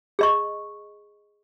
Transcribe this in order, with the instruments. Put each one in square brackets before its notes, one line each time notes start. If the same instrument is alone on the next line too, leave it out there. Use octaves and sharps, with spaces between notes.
[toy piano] G#4 D#5 C#6